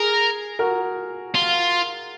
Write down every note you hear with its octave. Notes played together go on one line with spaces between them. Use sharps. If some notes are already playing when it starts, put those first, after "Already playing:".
Already playing: G#4 A#4
F#4 A#4
F4